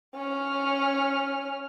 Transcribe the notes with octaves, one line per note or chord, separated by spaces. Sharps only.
C#4 F6